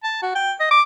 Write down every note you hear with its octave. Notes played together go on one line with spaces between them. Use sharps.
A5
F#4
G5
D#5
D6